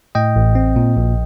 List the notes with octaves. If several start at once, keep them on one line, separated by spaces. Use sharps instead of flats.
A2 D#5 G5
A1
C4
A#2
A#1